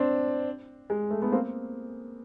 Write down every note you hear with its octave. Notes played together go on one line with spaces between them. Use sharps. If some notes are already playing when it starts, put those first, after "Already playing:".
Already playing: C4 D4
G#3
A3
A3 B3
A#3 C4